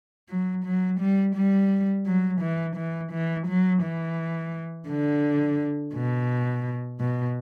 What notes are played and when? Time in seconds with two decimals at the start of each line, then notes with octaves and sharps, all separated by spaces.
0.29 F#3
0.65 F#3
1.00 G3
1.36 G3
2.06 F#3
2.41 E3
2.76 E3
3.12 E3
3.47 F#3
3.83 E3
4.88 D3
5.94 B2
7.00 B2